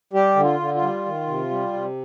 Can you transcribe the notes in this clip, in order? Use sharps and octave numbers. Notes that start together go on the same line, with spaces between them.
G3 G4
D3
F4
D3
F4
G3
D#3
C3
G3
C3